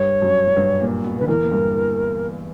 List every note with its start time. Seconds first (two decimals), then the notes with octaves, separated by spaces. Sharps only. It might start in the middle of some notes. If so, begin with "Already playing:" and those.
Already playing: G2 G3 C#5
0.22 F#2 F#3
0.47 F#3
0.57 G2 G3
0.81 A#2 A#3
1.04 B2 B3
1.19 D3 B4
1.28 E2 E3 A#4
1.43 A#3
1.51 G2 G3